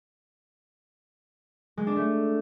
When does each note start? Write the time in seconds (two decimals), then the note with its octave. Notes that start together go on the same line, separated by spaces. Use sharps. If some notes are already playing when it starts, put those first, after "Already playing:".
1.77 G#3
1.87 D4
1.96 A3